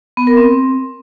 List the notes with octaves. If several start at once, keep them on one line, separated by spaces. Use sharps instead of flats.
B3
A#4
C4